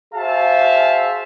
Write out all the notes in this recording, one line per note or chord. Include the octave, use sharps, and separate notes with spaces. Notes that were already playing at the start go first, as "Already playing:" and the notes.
F#4 G#4 C5 E5 F5 A5